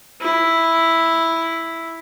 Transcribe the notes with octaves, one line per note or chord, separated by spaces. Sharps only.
E4